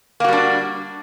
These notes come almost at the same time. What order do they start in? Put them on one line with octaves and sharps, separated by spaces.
A#3 F#4 G3 D4